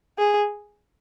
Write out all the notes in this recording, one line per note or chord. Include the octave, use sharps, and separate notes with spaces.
G#4